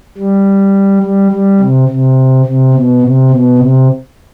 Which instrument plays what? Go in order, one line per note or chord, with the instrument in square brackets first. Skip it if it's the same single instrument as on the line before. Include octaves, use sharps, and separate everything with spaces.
[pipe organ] G3
G3
G3
C3
C3
C3
B2
C3
B2
C3